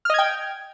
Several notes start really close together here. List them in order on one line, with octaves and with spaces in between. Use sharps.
F6 D#5 G#6 G5